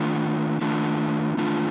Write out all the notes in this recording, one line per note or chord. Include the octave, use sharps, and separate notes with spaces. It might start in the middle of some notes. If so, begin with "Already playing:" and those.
Already playing: D#3 A3 D4 F4
D#3 A3 D4 F4
D#3 A3 D4 F4